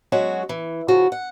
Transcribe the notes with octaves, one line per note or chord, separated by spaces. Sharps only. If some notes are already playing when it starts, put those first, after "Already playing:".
F#3 G#3 C#4 F#4
E3
C#3 F3 F#4
F#5